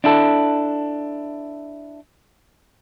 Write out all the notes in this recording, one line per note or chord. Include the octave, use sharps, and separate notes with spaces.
D4 E4 A4